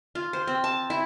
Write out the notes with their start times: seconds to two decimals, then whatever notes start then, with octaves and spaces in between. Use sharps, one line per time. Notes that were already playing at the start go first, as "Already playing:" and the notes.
0.15 F4
0.33 C5
0.47 C4
0.64 A5
0.90 E4